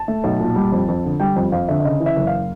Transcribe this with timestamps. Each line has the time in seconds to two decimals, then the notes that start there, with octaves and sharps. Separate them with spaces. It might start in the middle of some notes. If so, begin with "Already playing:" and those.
Already playing: A5
0.08 A3
0.24 B1
0.40 A#2
0.56 G3
0.72 F2
0.88 F2
1.05 D3
1.20 G3 G5
1.36 F2
1.52 F2 F5
1.68 D3 E5
1.80 E5
1.84 C#3 D#5
2.00 E3
2.06 E5
2.16 F#1
2.27 F5